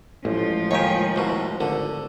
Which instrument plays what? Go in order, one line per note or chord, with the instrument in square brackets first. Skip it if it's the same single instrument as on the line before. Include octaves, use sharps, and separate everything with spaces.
[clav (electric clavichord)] A1 [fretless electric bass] A2 [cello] F3 G#3
[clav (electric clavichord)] D#2 D#3 G4 [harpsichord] C#5 G#5
[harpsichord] C2 B2
[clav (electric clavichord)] G#1 [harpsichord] D3